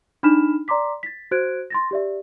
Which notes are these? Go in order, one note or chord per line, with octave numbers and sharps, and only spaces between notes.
D4 D#4 B5 F6 B6 E7
D5 A#5 C6 D6 B6
A6 B6
F#4 C5 F#6 G#6 D7
C6 A6 A#6
G4 D5 E5